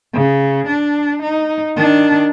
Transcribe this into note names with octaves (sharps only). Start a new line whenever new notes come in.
C#3
D4
D#4
D#3 D4